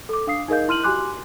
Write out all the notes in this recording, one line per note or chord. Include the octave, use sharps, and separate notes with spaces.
A4 D6
D4 F5 D#6 C7
D#4 G#4 A#4 D#5 F5 G6
E4 C6 F6 D#7 F#7
F#4 G4 G#5 C6 D6 F#6